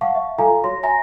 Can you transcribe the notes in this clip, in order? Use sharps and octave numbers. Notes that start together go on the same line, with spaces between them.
F5 F#5 A5 C#6
E5
F4 A4 F5 G#5 A#5
F#4 C#5 C6 A#6
E5 G#5 A#5 A#6